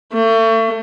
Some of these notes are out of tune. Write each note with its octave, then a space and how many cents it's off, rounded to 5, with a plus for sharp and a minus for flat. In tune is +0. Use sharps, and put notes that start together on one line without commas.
A3 +35